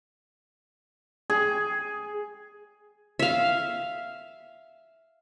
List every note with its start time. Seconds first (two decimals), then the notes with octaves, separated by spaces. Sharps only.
1.30 G#4
3.19 E5 F5